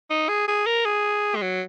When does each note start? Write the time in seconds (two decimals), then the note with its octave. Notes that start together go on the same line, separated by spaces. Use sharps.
0.10 D#4
0.29 G#4
0.48 G#4
0.66 A#4
0.85 G#4
1.36 G#3
1.42 F#3